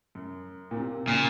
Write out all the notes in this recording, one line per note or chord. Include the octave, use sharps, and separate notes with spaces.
F#2
A#2
C3
A#2 C#3